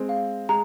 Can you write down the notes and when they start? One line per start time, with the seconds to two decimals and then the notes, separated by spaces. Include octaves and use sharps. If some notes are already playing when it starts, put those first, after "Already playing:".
Already playing: G#3 C4
0.09 F5
0.49 G#3 A#5